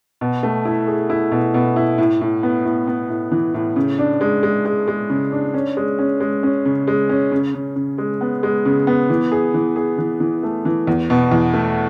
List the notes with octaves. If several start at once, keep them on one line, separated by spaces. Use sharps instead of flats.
B2
A3
E4
G#4
E4
B2
B2
E4
A2
A2
B3
A2
B3
A2
E3
A2
C#3
D4
G#3
G#3
G#3
G#3
C#3
D4
C#4
G#3
C#4
G#3
C#4
C#3
G#3
C#4
C#3
C#3
C#3
G#3
B3
G#3
C#3
B3
E3
G#4
E3
G#4
E3
E3
A3
E3
E2
B2
E2
A3